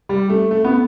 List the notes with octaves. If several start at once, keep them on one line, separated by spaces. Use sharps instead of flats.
G3
A3
A3
B3